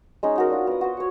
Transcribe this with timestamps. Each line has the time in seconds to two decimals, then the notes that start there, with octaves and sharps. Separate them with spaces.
0.23 G#3 C#4 D#4
0.36 D#4 F#4 A#4
0.50 D4 F4
0.67 B3 D#6
0.81 F#4 C5
0.97 C#5 C#6